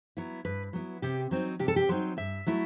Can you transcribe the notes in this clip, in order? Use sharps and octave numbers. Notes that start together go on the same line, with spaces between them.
F#3 B3 E4
G2 B4
F#3 B3 E4
C3 G4
F#3 C4 D#4
C3 G4
A4
G4
F#3 C4 D#4
G2 E5
F#3 A3 E4